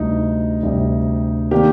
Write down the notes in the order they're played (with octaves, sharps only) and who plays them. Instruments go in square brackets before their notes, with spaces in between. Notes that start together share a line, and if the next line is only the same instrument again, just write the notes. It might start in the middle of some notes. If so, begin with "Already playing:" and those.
Already playing: [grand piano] D2 C3 G3 [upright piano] D#4
[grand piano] D2 C3 G3
[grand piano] D#3 A#3 D4 [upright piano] G4